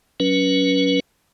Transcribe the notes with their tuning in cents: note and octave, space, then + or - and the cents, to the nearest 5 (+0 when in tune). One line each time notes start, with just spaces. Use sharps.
F#3 +0 C#4 +20 B4 -30